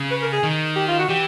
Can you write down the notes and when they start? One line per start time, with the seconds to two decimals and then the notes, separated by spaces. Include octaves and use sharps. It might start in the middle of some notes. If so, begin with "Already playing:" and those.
Already playing: C#3
0.11 B4
0.22 A#4
0.33 G#4
0.43 D#3
0.76 G4
0.88 F4
0.99 F#4
1.09 E3 G4